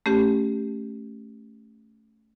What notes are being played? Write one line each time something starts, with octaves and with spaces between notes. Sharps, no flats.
A3 C#4 G4